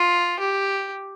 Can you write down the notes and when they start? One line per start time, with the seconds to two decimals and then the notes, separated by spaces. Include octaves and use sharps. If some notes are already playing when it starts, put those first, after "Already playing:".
Already playing: F4
0.39 G4